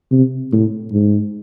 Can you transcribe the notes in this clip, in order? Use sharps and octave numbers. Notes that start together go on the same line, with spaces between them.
C3
A2
G#2